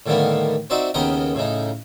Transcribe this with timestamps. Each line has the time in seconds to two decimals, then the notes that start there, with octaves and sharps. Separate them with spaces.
0.06 A2 D3 D#3 G3 A#3 B3
0.70 C4 D#4 F#4 D5 E5
0.94 D#2 C#3 B3 A#4 D#5 G5
1.35 A2 C#3 D#4